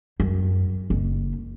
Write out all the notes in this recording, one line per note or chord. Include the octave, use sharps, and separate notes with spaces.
F#2
F#1